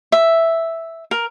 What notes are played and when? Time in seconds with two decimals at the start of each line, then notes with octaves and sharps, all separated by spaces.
0.12 E5
1.11 A#4